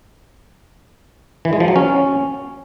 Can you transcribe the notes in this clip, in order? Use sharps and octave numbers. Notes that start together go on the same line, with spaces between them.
E3
G#3
F3
F#3
C#4